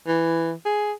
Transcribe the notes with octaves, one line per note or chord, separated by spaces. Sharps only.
E3
G#4